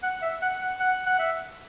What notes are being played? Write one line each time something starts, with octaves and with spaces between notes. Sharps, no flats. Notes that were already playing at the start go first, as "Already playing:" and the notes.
F#5
E5
F#5
F#5
F#5
F#5
E5